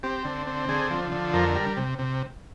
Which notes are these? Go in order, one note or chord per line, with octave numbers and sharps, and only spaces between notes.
C4 G4
D3
C4
D3 G#4
F3
D3
F2 A#4
G3
C3
C3